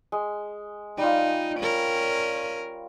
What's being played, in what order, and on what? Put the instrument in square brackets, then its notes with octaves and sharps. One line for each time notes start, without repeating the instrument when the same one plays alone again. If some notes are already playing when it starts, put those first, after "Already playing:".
[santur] G#3
[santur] G3 F4 [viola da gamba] D#4
[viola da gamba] C#4 A#4